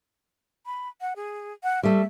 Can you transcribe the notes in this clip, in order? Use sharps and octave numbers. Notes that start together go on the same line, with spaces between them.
B5
F#5
G#4
F#5
G3 A3 E5